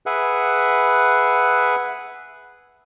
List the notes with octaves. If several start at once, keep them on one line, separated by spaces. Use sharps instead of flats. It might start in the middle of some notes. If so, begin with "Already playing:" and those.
G#4 B4 E5 F#5